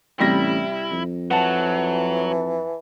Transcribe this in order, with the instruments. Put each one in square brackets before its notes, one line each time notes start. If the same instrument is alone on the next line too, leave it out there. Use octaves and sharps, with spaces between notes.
[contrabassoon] A1 [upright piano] C3 G3 A#6 [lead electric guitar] E4
[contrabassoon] F2
[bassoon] E3 [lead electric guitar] F#3 [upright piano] F#5 A5